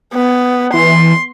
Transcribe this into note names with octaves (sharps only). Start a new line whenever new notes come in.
B3
E3 C6